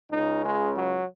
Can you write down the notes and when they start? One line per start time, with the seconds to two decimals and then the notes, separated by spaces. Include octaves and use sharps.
0.12 C#2 C#3 D#4
0.43 G#3
0.76 F#3